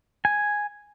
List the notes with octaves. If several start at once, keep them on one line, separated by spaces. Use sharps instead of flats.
G#5